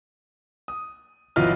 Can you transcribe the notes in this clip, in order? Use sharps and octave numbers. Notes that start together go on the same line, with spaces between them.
D#6
G1 E3 F#3 F4 D#5 F6